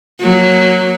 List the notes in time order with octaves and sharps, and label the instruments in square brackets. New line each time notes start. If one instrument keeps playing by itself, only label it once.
[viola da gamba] F#3 A#3